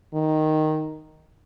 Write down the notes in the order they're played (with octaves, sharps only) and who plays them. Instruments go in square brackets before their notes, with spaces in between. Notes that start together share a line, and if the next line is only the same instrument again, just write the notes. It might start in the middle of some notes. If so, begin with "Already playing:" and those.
[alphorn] D#3